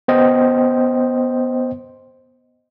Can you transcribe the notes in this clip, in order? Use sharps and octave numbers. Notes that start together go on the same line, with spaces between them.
B3 C5 D#5 G5